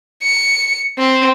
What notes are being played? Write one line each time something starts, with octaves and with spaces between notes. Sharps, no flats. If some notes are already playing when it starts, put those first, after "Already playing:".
C#7
C4